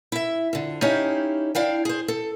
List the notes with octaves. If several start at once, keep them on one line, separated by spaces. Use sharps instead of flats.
E4 E5
F2 D3
C#4 D#4 E4 G4 C#5 F5
D4 E4 F5 G5
G#4 C5
A4